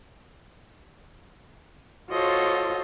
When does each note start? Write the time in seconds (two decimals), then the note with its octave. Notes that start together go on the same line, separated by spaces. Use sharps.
2.10 F4 F#4 A4 C5 C#5 D#5